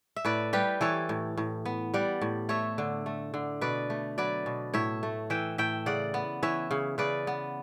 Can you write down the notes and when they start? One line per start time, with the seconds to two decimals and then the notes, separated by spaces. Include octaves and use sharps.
0.16 E5
0.25 A2 B4 D5
0.53 G3 G4 B4
0.81 E3 A4 C#5
1.09 A2
1.37 A2
1.66 B3
1.94 G3 D5 F#5
2.21 A2
2.49 A3 C#5 E5
2.78 D3
3.06 A3
3.34 D3
3.61 B2 B4 D5
3.90 A3
4.18 F#3 B4 D5
4.46 B2
4.74 A2 C#5 E5
5.03 A3
5.30 E3 E5 G5
5.58 A2 E5 G5
5.86 C#3 D5 F#5
6.14 B3
6.43 E3 C#5 E5
6.71 C#3
6.98 C#3 B4 D5
7.27 B3